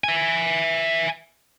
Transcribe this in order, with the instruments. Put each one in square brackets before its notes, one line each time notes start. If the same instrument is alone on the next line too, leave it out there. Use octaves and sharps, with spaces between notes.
[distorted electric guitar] E5 G#5